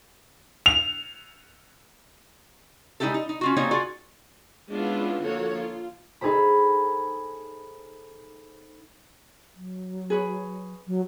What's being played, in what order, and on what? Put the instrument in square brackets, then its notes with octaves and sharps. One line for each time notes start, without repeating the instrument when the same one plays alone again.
[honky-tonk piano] F7
[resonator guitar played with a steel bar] G3 G#3 D#4 E4 G4 A4
D#4
D#4
C#4 F4 F#4
G3 A#3 C4 D#4 C#5 G#5
F4 F#4 G#4 D5
[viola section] G#3 B3 C#4 D4 E4 F4
D3 F3 A#3 F#4 A4 C#5
F4
[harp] D#4 G#4 A4 C5 B5
[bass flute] F#3
[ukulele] G#4 B4 C#5
[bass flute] F#3